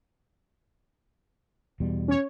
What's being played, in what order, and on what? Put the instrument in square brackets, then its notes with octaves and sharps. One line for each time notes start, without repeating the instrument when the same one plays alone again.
[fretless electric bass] E2 B2 G3
[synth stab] C#4 C#5